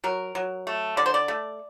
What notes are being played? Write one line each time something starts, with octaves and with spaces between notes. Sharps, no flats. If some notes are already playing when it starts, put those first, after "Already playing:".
F#3 A#4
F#3
A3
D3 D5
C5
D5
A3